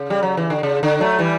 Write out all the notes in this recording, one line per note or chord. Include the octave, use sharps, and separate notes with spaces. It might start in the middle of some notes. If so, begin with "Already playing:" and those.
Already playing: C#3
G3
F#3
E3
D3
C#3
D3
F#3 A3
E3 G3